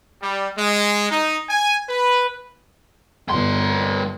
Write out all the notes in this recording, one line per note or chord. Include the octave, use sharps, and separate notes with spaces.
G3
G#3
D#4
G#5
B4
G1 G2 C6